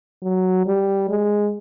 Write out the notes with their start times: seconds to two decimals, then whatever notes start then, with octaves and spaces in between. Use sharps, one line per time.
0.22 F#3
0.66 G3
1.10 G#3